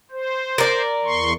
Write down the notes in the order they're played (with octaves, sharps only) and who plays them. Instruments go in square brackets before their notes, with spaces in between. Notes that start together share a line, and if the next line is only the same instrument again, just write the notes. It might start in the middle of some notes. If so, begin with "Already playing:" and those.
[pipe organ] C5
[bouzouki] A#4 D5
[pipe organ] E2 C6 C#6